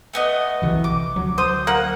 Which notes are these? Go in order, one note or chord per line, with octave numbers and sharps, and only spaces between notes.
A3 B3 D#5
B1 C3 E3
D6
D2 F#3
C5 D#6
A#3 F#5